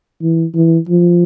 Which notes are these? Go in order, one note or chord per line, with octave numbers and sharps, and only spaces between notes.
E3
E3
F3